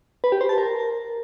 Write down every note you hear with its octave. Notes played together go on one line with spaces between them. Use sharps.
B4
G4
C5
A5
A#4